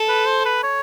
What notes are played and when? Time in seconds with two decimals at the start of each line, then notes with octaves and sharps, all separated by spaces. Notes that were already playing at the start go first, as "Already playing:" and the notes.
Already playing: A4
0.08 B4
0.27 C5
0.45 B4
0.63 C#5